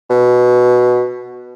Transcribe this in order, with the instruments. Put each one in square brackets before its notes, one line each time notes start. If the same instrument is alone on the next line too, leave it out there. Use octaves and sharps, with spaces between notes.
[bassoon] B2